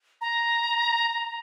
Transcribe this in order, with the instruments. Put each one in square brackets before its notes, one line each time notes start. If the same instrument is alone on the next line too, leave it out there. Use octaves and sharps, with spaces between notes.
[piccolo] A#5